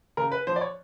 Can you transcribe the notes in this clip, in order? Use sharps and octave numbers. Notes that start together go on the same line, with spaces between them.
C#3 A#4
B4
F3 C5
D5
C#5